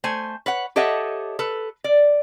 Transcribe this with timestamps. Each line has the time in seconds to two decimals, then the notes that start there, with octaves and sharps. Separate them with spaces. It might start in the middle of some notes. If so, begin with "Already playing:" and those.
0.04 A3 C5 G#5
0.46 B4 C#5 F#5
0.76 G4 A4 C#5 D#5 E5 F#5
1.39 A4 B4
1.84 D5